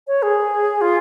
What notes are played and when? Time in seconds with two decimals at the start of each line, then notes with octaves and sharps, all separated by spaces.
0.07 C#5
0.22 G#4
0.81 F4